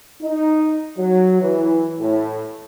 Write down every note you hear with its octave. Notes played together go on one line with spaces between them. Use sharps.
D#4
F#3
E3
A2